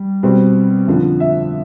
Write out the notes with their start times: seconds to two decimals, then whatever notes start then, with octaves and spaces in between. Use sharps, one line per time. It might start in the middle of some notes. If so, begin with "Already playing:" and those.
Already playing: G3
0.23 B2 G3 C4
0.88 F2 D3 F3
1.20 E5